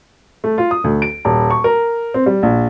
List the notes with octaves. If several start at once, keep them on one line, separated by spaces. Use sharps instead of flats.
A3
F4
D#6
D2
D7
D#1
C#6
A#4
C4
G3
A#1